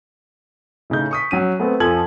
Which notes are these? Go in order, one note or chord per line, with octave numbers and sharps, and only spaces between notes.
A2 C#3 D#4 G6
C#6 D#6 B6
F#3 C#4 D#7
A3 B3 C4
F2 F3 A4 G#5 G#6 F#7